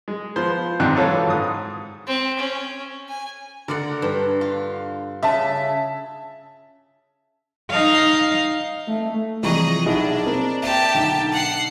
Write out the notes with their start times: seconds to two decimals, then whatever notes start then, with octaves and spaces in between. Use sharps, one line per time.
0.08 G#3
0.36 F3 B3 C5
0.80 G#2 C3 D4 D#4 G5 F#6
0.96 E3 F#3 F4 F#4 A4 C#5
1.27 G#2 D#6
2.07 C4
2.39 C#4
3.09 G#5
3.68 D3 A#4 D5 F#5
4.02 G2
4.41 F4
5.23 C#3 E5 A5
7.71 D#4 F5
8.88 A3
9.43 C3 E3 F3 G3 G#4 D#5 A#5 C#6
9.86 B1 D4 E4 G#4 D#5
10.26 A#3 C4 A#4
10.62 G4 E5 A5
10.94 B1 D3 D#4
11.32 F#5 C7